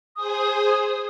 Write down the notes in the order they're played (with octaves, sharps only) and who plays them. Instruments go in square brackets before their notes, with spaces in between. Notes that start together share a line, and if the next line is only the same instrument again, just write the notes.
[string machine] G#4 C5 G#5 [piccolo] D#6